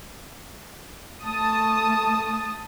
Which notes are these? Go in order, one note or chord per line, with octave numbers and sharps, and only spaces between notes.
A3 A5 D#6